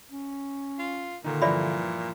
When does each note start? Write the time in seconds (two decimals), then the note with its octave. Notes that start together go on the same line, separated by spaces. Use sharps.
0.10 C#4
0.79 F4
1.24 A#2 D3 D#3 D#4
1.42 G2 E3 F3 D5 E5 B5